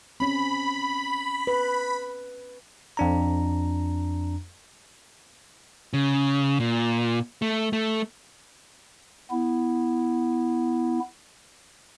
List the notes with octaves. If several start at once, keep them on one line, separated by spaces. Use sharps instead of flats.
C4 C#4 B5
B4
F2 D4 A#5
C#3
A#2
A3
A3
B3 E4